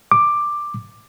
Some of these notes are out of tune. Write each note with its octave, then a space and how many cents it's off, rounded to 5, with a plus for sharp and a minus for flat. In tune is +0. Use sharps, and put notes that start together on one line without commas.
D6 +10